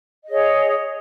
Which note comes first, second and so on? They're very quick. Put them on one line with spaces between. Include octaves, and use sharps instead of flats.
D#5 G#4 C#5